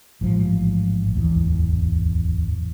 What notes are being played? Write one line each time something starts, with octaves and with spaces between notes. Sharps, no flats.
A1 G#2 F3
D1 G#1 E2